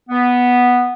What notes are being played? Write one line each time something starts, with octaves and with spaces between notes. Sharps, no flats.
B3